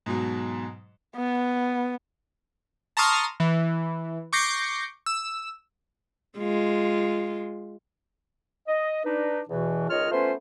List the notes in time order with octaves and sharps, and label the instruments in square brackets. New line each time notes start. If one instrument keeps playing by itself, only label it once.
[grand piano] G#2 B2 F#3
[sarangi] B3
[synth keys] A5 A#5 C6 C#6 D#6 F6
E3
C#6 D6 G6 A#6 C7 C#7
E6
[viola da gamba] G#3 F4
[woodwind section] D#5
D4 D#4 B4
E2 B2 E3
C#2 D#3 F4 C#5 D#5 F6
A3 B3 C#4 F4 B4 C5